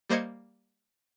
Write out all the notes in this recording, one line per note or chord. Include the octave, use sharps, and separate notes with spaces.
G3 A#3 C5 D#5 G#6 C#7